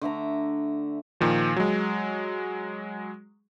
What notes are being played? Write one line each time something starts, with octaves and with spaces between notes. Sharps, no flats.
D3 A3 E5 A#5
A#2 D#3 F3
F#3 G#3